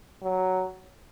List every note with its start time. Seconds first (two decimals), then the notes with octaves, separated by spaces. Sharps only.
0.23 F#3